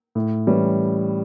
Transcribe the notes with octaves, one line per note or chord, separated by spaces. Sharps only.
A2
E3 G3 C#4